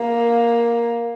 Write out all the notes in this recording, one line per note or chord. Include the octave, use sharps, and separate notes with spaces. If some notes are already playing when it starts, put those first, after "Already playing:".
Already playing: A#3